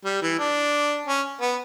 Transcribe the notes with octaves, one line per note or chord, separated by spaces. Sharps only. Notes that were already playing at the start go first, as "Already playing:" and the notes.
G3
E3
D4
C#4
B3